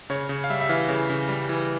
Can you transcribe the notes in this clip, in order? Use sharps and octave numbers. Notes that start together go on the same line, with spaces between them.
C#3 C#5
C#3
F5
G3 E5
E5
E3 F5
C#3
C#3
G3
E3